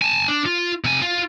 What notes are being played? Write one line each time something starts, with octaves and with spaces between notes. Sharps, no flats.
G#5 A5
D4
F4
C3 G#5
F4